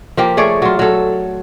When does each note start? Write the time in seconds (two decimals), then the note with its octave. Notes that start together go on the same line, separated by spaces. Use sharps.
0.17 F3 A#3 G4
0.37 A3 G#4 C#5 D5
0.62 F#3 F4
0.79 F#3 A4